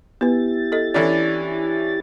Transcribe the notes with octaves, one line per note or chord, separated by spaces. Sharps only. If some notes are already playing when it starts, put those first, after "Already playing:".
B3 E4 G4 B4 A6
A4 D#5
E3 C#4 D4 A4 D5